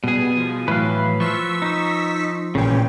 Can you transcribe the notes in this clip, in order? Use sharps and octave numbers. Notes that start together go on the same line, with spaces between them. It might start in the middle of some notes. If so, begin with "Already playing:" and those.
B2 G3 B3 G#4
F3
A2 E3 F#3 B4 F5
F3 C#6 E6 B6
D#4
A1 A#2 C#3 E3 C#4 G5